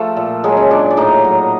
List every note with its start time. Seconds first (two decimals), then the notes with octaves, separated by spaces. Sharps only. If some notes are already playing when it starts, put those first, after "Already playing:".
Already playing: F3 A3 F4 A4
0.17 A#2
0.44 F#3 G#3 G#4
0.57 C#4 C#5
0.70 A#2 D4 D5
0.91 D5
0.97 A2 D#4 D#5
1.24 F#3